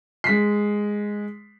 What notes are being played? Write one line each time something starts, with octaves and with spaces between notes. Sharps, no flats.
G#3 B6 C7